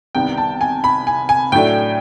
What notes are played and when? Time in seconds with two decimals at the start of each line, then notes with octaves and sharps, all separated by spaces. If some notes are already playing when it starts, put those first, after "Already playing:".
0.15 C2 C3 D#3 G3 B3 G5
0.38 A5
0.61 G#5
0.84 B5
1.07 G#5
1.29 G#5
1.52 A2 F#3 A3 D4 G5